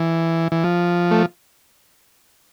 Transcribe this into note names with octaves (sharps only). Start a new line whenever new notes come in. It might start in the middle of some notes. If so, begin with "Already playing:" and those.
Already playing: E3
E3
F3
A3